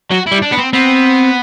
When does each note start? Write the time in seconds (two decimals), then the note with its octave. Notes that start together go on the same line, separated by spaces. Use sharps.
0.11 F#3 F#4
0.27 G3 E4
0.42 D4
0.52 B3
0.58 C4
0.73 B3 C4